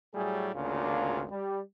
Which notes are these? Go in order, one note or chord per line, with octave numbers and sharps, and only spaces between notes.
A2 F#3 G3 A3 G#4
G#1 D2 C#3 A#3 D4 F4
G3